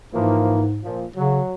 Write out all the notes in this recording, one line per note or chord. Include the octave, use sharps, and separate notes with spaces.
G#2 E3 F3 A#3
A#2 F3
C#3 F#3